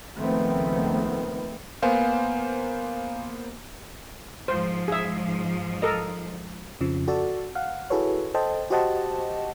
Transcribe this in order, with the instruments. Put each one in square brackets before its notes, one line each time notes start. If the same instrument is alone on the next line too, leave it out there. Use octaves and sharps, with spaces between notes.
[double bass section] C#2 D#3 F3 A3 B3 C4
[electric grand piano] A#3 B3 C5 [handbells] F5 G#5
[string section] G#2 F3 [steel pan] C5
[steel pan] G#4 E5
A4 A#4 D#5
[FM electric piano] F2 C#3 F3
F#4 A4 D5 A5
F5 F#5
E4 F#4 G#4 A4 B4 C#5
A4 C5 D#5 G5 A5
F#4 G4 C5 D#5 F#5 A5